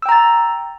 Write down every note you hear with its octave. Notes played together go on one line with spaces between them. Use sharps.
G5 A#5 E6 A6